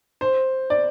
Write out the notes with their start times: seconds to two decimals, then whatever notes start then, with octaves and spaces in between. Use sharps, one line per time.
0.21 C5
0.70 D5